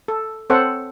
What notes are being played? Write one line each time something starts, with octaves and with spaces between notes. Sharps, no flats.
A4
C4 A4 C5 C#5 F#5